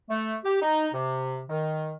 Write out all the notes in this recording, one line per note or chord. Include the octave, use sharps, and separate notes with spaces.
A3
G4
D#4
C3
D#3